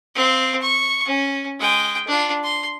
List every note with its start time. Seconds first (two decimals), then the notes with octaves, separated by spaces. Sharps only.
0.15 C4 F5
0.61 C#6
1.05 C#4
1.60 G#3 G5
2.08 D4 F4
2.43 C6